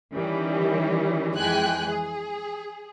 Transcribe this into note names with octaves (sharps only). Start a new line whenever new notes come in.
D#3 E3 G3 C#4
F2 E3 G#3 G5 G#5 F#6
G#4